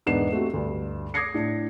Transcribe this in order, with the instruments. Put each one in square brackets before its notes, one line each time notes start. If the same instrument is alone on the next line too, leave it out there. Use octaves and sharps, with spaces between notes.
[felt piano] E1 G#2 B3 D4 C7 E7
A3 C4 F#4 G4
D2 G2
D6 D#6 G#6 A#6 C7 C#7
A2 D4